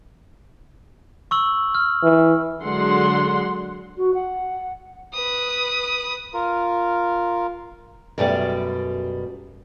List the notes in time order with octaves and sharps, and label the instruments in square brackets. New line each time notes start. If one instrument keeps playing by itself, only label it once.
[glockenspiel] C#6 E6 F#7
F6
[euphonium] E3
[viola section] D3 F#3 G#3 F#5 C6
[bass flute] F#4
F#5
[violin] B4 D#6
[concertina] F4 A#4
[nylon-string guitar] F#2 B2 G3 A3 B3 D5